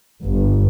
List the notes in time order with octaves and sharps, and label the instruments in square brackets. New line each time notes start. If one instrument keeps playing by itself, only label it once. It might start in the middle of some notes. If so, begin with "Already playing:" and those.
[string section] G1